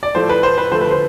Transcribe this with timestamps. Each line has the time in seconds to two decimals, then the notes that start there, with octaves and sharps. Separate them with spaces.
0.03 D5
0.15 A2 F3 A3 C5
0.29 B4
0.43 C5
0.58 B4
0.71 D3 F3 A3 C5
0.81 B4
0.91 C5